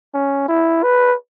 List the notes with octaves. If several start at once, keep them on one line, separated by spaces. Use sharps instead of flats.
C#4
E4
B4